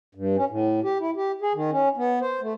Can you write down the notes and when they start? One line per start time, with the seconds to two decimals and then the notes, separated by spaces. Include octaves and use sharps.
0.15 G2
0.36 C#4
0.49 A2
0.84 G4
1.00 E4
1.16 G4
1.41 G#4
1.54 D#3
1.71 C#4
1.97 B3
2.21 C5
2.41 A3